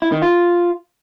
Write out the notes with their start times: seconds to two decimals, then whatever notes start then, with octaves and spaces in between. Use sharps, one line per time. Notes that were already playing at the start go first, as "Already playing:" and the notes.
0.02 E4
0.12 D#3
0.22 F4